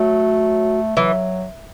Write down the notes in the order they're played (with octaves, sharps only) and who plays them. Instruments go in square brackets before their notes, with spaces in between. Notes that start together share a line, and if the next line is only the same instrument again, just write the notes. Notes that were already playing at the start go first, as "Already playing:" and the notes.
Already playing: [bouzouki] F#3 [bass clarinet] A3
[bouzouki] E3 [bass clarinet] F#3